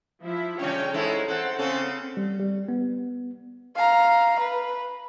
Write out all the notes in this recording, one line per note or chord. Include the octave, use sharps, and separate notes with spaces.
F3 E4 E5
C#3 G3 C#4 C#5 G5
G#2 G#3 E4 A4 C#5
C4 A4 F#5
C#3 C4 C#4 A4
G3
G3
B3
F5 A#5
B4